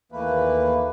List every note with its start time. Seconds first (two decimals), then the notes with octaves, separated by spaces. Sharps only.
0.12 D#2 E3 A3 A#3 B4